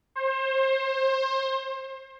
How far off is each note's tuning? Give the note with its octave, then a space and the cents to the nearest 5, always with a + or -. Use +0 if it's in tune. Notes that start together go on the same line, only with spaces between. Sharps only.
C5 +30